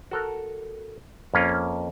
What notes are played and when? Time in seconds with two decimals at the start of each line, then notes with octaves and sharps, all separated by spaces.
0.11 F#4 A4 A#4
1.34 F2 A#3 C#4 F4